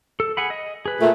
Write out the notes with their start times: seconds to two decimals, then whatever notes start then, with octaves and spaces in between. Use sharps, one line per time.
0.20 A4
0.37 G#4 F#5 B5
0.50 D#5
0.86 G#4 B4
0.99 A#2 A3